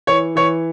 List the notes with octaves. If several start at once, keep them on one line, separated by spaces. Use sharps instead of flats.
E3 C#5
E3 C#5